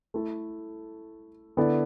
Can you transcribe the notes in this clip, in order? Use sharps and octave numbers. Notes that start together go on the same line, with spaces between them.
A3 E4 A4
D3 B3 E4 A4 D5